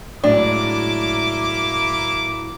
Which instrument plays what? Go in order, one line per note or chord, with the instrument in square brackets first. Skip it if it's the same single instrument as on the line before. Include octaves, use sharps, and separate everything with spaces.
[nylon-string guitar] A2 F#3 G#3 [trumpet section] A#3 E4 D6 [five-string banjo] D4